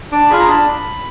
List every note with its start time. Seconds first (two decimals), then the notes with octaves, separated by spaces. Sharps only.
0.12 D4 D6
0.30 F4 G#4 B5
0.40 A#5
0.48 D4 B5